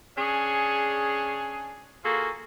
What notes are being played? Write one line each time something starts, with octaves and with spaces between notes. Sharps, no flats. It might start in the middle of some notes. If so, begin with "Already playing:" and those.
C#4 D4 G#4
A#3 F4 F#4 G#4 A4